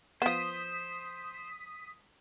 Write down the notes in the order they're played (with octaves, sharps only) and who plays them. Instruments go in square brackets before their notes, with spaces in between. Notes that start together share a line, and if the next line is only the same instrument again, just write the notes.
[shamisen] F3 B3 [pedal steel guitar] C5 [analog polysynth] D#6 B6